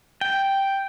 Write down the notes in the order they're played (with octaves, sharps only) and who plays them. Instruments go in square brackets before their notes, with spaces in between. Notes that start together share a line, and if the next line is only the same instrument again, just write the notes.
[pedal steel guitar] G5